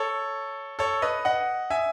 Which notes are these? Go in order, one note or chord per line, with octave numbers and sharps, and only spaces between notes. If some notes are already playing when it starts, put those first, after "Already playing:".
Already playing: A4 C#5
A4 C#5
B4 D#5
D#5 F#5
E5 G#5